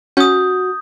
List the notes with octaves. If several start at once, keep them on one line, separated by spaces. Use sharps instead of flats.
C#4 F#4 D#6 G6